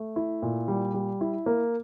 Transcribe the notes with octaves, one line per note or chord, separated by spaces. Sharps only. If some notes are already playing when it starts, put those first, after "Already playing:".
Already playing: A3
E4
A#2
G3
G3
E4
A#3